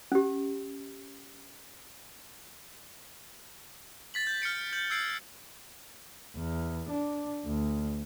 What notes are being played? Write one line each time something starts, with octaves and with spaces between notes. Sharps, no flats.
C#4 G4
A6 B6 F#7
G6
F6 B6 C#7 D7
G6 F#7
E6 G#6 C7 D7 F#7
E2
D4
D2